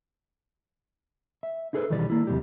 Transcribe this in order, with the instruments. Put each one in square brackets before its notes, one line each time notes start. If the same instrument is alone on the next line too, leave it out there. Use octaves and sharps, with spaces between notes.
[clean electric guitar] E5
D#4 E4 G#4 A4 B4 C5
B1 D#3 E3 G3 D5
A#3 E4
D#2 C3 D#3 F#3 G3 G4